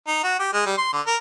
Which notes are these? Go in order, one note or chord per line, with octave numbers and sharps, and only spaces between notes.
D#4
F#4
G4
G#3
G3
C6
D3
A#4